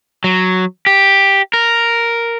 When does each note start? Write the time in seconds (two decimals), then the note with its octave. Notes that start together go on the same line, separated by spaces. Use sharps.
0.24 F#3
0.86 G4
1.53 A#4